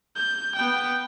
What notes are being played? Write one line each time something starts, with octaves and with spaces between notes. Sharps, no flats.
G6
B3 G5